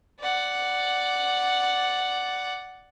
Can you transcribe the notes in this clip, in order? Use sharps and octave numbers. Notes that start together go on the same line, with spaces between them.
D5 F#5